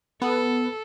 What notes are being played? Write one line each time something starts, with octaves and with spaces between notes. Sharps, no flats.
B3 A4